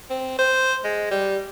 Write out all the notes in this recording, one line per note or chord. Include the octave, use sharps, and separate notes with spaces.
C4
C5
G#3
G3